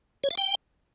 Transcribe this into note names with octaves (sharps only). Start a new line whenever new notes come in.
C#5
F5
G5